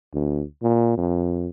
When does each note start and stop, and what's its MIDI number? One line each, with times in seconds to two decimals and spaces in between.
0.14 0.44 38
0.63 0.96 46
0.98 1.49 41